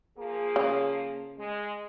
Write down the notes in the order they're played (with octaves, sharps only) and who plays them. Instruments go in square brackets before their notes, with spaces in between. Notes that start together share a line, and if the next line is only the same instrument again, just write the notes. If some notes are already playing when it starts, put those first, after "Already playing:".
[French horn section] F3 A#3 G#4
[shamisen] C#3
[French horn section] G#3